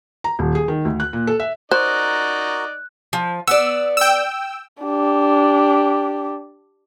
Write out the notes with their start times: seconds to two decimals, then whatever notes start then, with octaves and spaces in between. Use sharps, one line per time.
0.24 A#5
0.39 D#1
0.55 G#4
0.68 D#3
0.85 D2
1.00 F#6
1.13 A#2
1.27 A4
1.40 E5
1.72 D#4 F#4 A#4 C5 D5 F#6
3.13 F3
3.47 B3 D5 E6
3.97 G5 E6
4.83 D4 G4